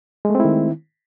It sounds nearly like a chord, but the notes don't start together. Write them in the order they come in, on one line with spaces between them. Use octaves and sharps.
G#3 A3 C4 E4 D#3